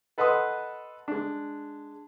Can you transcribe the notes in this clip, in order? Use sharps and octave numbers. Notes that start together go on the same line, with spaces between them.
A4 B4 D#5 F#5 C6 D#6
G#3 D4